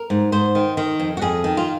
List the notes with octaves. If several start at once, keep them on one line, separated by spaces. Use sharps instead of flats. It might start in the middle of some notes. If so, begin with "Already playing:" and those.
Already playing: A#4
G#2
G#2 C5
D#3
D#3
F2
F#4
F2 G#4
D#3
F4